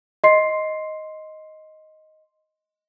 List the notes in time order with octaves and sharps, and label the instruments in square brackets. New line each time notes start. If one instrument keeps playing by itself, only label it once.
[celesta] D#5 C6 C7